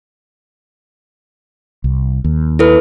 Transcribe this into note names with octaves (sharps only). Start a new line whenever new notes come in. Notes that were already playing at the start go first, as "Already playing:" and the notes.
C2
D#2
E4 A4 B4